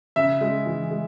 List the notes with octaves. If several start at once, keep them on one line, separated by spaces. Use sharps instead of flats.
C#3 E5
G#3
E3
G#3